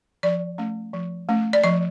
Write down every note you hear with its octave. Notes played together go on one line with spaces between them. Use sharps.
F3 D5
A3 C#4
F3
A3 C#4
D5
F3 D#5